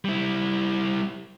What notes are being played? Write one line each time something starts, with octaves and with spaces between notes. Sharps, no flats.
G3 E4